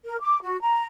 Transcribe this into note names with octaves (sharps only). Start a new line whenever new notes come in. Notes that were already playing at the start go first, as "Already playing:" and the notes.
A#4
D6
F#4
A#5